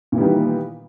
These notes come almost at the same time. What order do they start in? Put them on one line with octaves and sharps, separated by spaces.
A#2 E3 G3 D#3 B3